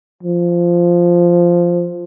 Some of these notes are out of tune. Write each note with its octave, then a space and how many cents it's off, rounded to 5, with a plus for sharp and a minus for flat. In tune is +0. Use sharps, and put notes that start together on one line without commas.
F3 -5